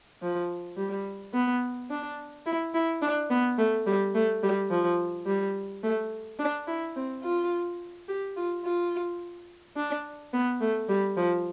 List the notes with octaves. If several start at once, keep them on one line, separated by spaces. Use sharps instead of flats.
F3
G3
B3
D4
E4
E4
D4
B3
A3
G3
A3
G3
F3
G3
A3
D4
E4
C4
F4
G4
F4
F4
D4
B3
A3
G3
F3